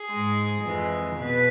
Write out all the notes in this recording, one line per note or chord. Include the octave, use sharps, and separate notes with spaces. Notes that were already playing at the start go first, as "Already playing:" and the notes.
Already playing: G#4
G#2 G#3
F2 E3 G#3
B2 B4